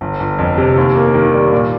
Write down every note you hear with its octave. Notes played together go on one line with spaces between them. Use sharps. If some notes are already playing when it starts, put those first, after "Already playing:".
G1
G1
F2
C3
D#2
A#3
D#3
G3
A#2